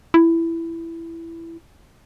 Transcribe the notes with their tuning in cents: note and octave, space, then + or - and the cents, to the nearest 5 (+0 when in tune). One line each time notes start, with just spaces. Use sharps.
E4 +10